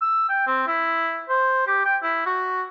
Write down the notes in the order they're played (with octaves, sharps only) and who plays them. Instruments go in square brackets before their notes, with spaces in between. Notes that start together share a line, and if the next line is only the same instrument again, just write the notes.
[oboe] E6
G5
C4
E4
C5
G4
G5
E4
F#4